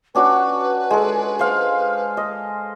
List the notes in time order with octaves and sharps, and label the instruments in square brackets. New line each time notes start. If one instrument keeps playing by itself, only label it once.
[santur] C#4 D4 F#4 [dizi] B4
[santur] G#3 A4
C5 F5
D#5